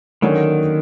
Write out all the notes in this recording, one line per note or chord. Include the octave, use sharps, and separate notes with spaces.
D3 D#3 F#3 A#3 C#4